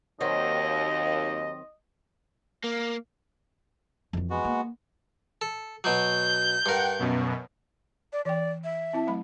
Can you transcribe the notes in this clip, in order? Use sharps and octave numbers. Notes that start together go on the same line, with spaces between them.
D#2 D#3 F#3 C4 D#5
A#3
F2 E3
G#3 B3 F#4
A#3
A4
B2 F#3 G6
G2 A#4 F#5 G5
F#2 B2
D5
E3 D5 G5
E5
C4 E4 A5
F#3 A3 B5